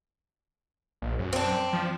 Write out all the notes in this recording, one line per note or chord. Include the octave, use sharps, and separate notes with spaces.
A#1
F#2
C4 D4
F3